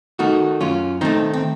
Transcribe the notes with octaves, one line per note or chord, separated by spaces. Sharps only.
D#3 A3 D#4 F#4
F#2 C#4 F4
D#3 A3 C4 D#4
C4